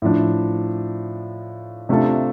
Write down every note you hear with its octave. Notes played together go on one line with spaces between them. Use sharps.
A2 F3 D4
C3 A3 D4 F4 A4